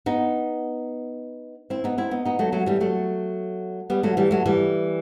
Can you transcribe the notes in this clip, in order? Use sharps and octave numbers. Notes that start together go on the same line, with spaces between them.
B3 D#4
C4 E4
B3 D#4
C4 E4
B3 D#4
B3 D#4
F#3 A3
F#3 A3
E3 G3
F#3 A3
G3 B3
F#3 A3
E3 G3
F#3 A3
E3 G3